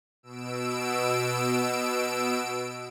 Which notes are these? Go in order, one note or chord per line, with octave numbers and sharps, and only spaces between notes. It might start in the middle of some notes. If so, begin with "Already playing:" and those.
B2 E6 D7